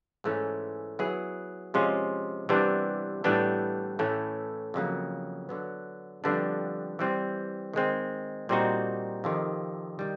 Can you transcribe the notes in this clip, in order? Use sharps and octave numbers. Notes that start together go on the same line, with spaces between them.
G#2 E3 A3 C#4
F#3 B3 E4 G#4
C3 F3 G#3 C#4 F4
C3 E3 G3 B3 D4
A2 E3 G3 B3 D4
A2 E3 A3 C#4
F2 C#3 F#3 A#3
D3 F#3 B3
F2 D3 G3 B3 D4
E3 G3 C4
D#3 G#3 C4
A#2 G3 C4 D#4 F#4
F2 C3 D#3
D#3 G3